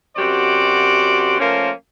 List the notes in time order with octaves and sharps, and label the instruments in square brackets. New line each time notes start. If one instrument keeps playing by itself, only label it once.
[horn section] F#2 C3 F#4 G4 C5 D5
F3 A3 A#3 C#4 A#4 C5